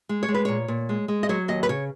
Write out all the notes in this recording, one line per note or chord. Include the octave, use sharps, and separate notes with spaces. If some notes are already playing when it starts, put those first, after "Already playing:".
G#3
C#5
G#3
B4
A#2 C#5
A#2
G#3
G#3
D#5
F#3 C#5
D#2 D#5
B4
C#3 C#5